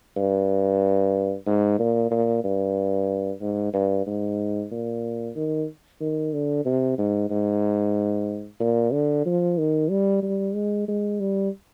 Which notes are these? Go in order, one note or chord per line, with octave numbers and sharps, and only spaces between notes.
G2
G#2
A#2
A#2
G2
G#2
G2
G#2
A#2
D#3
D#3
D3
C3
G#2
G#2
A#2
D3
F3
D#3
G3
G3
G#3
G#3
G3